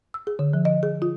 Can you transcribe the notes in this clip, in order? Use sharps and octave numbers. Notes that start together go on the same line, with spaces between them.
E6
G#4
D3
F3
D#5
G#4
F4